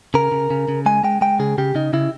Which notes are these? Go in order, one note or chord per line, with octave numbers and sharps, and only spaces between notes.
C#3 A#4
C#3
C#3
C#3
G#3 G#5
G#3 G5
G#3 G5
C#3 G#4
C#3 G4
C#3 D#4
C#3 E4